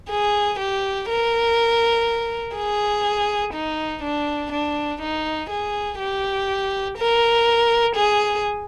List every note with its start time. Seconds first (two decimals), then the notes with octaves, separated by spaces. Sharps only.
0.10 G#4
0.59 G4
1.09 A#4
2.56 G#4
3.54 D#4
4.03 D4
4.52 D4
5.02 D#4
5.50 G#4
5.99 G4
6.98 A#4
7.96 G#4